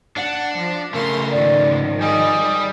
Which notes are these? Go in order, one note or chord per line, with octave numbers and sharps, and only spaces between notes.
D4 F#5
F3
C#3 A3 A#4 F5 A#5 C6
G#2 D#3 F3 D5
G3 G#4 D5 D#5